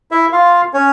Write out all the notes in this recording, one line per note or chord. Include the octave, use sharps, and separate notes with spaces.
E4 E5
F4 F5
C#4 C#5